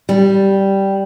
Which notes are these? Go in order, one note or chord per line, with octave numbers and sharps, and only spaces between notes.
G3